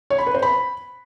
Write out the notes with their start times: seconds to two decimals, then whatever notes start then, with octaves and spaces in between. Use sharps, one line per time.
0.10 C#5
0.18 B5
0.26 B4
0.35 C5
0.43 B5